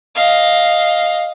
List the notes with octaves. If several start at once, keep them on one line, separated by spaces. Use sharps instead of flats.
D#5 F5